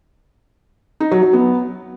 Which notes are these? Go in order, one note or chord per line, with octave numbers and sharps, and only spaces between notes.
D#4
F#3
F#3
B3